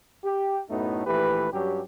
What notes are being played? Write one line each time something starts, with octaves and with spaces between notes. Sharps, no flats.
G4
F#2 A2 F#3 A3 B3 D#4
A#1 E3 A3 G4 B4
G2 F#3 C#4 G4